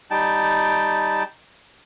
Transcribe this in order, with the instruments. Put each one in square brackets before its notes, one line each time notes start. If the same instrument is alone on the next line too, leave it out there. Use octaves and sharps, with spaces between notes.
[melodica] G3 D#4 G5 A5